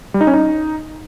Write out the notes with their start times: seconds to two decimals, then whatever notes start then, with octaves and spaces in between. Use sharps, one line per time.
0.14 G3
0.21 D#4
0.27 C#4
0.33 D#4